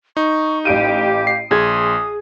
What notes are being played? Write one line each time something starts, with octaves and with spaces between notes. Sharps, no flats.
D#4 C#6
A1 G4 F5 D7 D#7
C7
A#1 G#4 C6 D#6 G#6